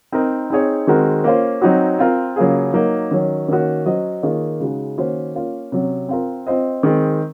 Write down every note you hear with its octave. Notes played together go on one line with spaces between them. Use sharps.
C4 D#4 A#4 D#5
C4 D#4 G#4 C#5
D#3 G#3 C4 F#4 A#4
A#3 C#4 F4 C5
F#3 C4 D#4 F#4
C4 F4 A#4
C#3 F#3 A#3 F4 G#4
F#3 A#3 D#4
D#3 F#3 C#4
D#3 A#3 C#4 F#4
F#3 C#4 F#4 C5 D#5
D#3 A#3 F4 G#4 C#5
C#3 G#3 D#4 F#4
D#3 A#3 C#4 F#4 C5
A#3 C#4 F4
C3 F#3 C#4
C4 F4 A#4
C4 F4 C5 D#5
D#3 G#3 C4